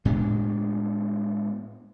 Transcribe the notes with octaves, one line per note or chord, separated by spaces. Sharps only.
A2 G#3 B3 D4